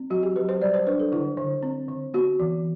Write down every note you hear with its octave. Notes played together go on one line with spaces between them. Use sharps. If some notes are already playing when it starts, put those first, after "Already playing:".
Already playing: C4
F#3 F#4
G4
F#3 B4
C5
G3 D5
C5
D4 B4
A4
D3 E4
D3
C4
D3
B3 F#4
E3